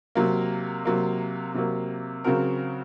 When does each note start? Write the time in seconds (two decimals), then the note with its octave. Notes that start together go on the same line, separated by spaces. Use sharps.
0.15 C3 F#3 A#3
0.85 C3 F#3 A#3
1.54 C3 F#3 A#3
2.24 C#3 F#3 C4 F#4 A#4